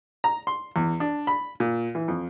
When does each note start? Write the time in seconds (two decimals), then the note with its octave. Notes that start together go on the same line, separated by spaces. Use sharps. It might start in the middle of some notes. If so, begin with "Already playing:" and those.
0.24 A#5
0.47 C6
0.76 E2
1.00 D4
1.27 B5
1.60 A#2
1.95 E3
2.08 F2